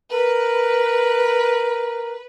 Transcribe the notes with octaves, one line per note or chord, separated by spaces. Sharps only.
A#4 B4